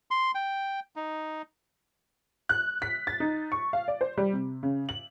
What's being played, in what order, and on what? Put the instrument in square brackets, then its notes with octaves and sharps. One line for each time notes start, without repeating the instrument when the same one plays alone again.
[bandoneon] C6
G5
D#4
[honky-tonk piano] F#6
B6
A6
D#4
C#6
F5
D5
C5
G3
C3
C#3
F#7